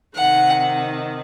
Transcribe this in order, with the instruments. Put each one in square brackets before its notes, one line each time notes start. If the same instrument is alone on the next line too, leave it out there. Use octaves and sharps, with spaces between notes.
[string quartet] C3 D#3 F#5